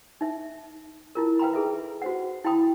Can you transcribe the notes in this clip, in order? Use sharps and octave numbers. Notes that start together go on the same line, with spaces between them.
D#4 E5
E4 F4 A#4
B4 F5 G5 A#5 B5
D#4 G#4 A4 B4 E5
F#4 C5 F#5
E4 F5 G5 B5 D#6